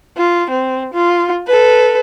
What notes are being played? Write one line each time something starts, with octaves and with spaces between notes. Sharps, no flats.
F4
C4
F4
A4 B4